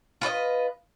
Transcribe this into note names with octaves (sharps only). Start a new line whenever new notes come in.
F4 B4 C#5 D#5